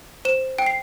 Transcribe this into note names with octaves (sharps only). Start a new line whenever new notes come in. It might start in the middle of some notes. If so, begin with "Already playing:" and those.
C5 E7
G5 D7
C7